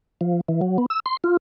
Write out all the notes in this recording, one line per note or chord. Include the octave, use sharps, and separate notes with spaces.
F3
E3
F#3
B3
E6
C6
F4